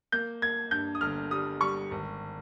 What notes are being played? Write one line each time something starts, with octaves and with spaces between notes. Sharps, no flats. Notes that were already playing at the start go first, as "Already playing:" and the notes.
A#3 G6
A#3 G#6
G2 G6
D#6
G1 F6
G3 D#6
G3 C#6
G#1